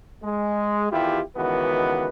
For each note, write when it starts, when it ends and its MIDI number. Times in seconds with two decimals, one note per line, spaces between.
0.23 0.88 56
0.92 1.21 40
0.92 1.21 51
0.92 1.21 64
0.92 1.21 65
0.92 1.21 67
1.36 2.08 37
1.36 2.08 51
1.36 2.08 52
1.36 2.08 59
1.36 2.08 66
1.36 2.08 71